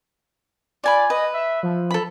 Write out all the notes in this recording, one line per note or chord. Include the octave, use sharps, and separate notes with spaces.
F4 D5 G#5 B5
B4 D#5
E5
F3
A4 B5